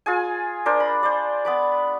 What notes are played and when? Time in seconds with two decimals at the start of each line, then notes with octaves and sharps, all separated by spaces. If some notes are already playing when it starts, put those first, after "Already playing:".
0.06 F4 G#4 G#5
0.66 D4 A#4 C5
0.80 B5
1.03 C5 D5
1.45 B3 B5 D6